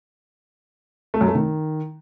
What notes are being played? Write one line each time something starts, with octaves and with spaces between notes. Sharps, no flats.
A3
F#2
A3
D#3